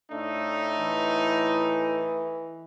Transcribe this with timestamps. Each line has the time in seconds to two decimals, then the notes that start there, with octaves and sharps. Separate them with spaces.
0.11 A2 A3 D4 D#4
0.80 E3